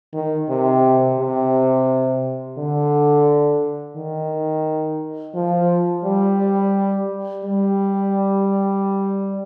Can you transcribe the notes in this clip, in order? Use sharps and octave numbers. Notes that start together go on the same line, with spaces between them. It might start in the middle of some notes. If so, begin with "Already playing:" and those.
D#3
C3
C3
D3
D#3
F3
G3
G3